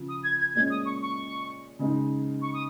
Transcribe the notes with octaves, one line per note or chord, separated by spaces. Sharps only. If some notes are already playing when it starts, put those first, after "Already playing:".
Already playing: C#3 F3
D#6
G#6
G#6
A#2 G#3 C#4 G#6
D#6
C#6
C#6
C#3 G#3 D#4
C#6
D#6